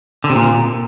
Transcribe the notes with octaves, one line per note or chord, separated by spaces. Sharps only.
D3
C3
A#2